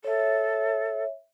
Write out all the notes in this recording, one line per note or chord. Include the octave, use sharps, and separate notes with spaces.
A4 C#5 E5